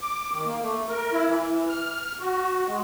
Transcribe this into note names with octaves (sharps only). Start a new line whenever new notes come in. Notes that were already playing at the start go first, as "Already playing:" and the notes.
D6
D#3
A#3
A3
A#4
E4
E3
F6
F#4
G#3